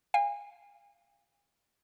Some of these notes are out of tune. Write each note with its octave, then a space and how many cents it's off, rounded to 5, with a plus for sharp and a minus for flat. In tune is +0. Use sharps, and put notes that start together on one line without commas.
F5 -5 G#5 -35